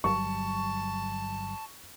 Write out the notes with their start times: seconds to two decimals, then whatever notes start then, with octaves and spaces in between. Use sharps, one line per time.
0.04 G1 F#3 G3 A5 C#6